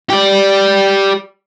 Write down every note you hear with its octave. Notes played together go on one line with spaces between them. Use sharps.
G4 D5